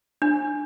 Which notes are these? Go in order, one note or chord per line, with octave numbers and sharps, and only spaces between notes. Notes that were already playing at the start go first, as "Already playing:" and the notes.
D4